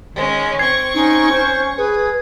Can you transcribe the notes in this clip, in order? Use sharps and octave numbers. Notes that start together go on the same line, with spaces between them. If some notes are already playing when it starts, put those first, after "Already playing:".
D#3 G#3 C#4
C4 C#6 G#6 C7
C#4 D#4
C5
G#4 B4